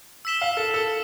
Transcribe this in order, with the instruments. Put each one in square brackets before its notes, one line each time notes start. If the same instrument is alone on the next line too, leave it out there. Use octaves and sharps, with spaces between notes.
[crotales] E6 B6 E7 G7
[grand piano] F5
A4
A4